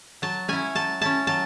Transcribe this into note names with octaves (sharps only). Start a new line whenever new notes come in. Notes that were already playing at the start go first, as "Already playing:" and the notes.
F#3 A5
C#4 E4 G#5
F#3 A5
C#4 E4 A5
F#3 A5